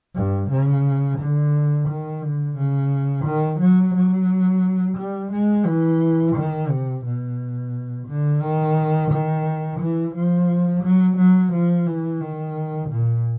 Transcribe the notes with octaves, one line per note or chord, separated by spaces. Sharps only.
G2
C#3
D3
D#3
D3
C#3
D#3
F#3
F#3
G3
G#3
E3
D#3
C3
B2
D3
D#3
D#3
E3
F3
F#3
F#3
F3
E3
D#3
A#2